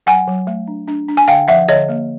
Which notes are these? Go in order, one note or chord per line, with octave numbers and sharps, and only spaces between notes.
F#3 F#5 G#5
F#3
A3
D4
D4
D4
G#5
D3 F5 G5
F3 E5 F#5
D3 C#5 D#5
A#3